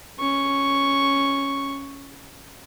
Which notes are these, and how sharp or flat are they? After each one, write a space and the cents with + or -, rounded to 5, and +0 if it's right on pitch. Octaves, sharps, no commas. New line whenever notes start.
C#4 +0 C#6 +0